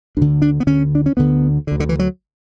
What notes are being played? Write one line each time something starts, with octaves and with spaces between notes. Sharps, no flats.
D2 D3 D4
D4
B3
D2 D3 C#4
D4
C#4
D2 D3 B3
D3
D2
D3
E3
F#3